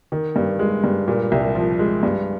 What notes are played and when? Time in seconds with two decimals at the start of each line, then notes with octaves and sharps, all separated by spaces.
0.12 D#3
0.36 G2
0.59 G#3
0.84 G2
1.08 A#2
1.32 C2
1.55 F3
1.79 G#3
2.03 G2